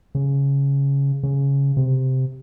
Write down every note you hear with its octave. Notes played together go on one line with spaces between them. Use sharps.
C#3
C#3
C3